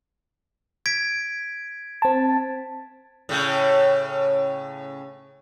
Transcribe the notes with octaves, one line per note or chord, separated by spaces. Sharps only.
G#6 B6 D7
C4 A5
A2 C#3